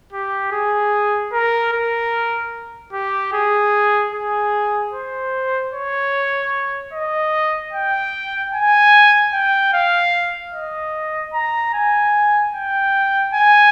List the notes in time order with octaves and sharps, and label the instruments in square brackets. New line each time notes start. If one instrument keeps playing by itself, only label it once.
[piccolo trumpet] G4
G#4
A#4
A#4
G4
G#4
G#4
C5
C#5
D#5
G5
G#5
G5
F5
D#5
A#5
G#5
G5
G#5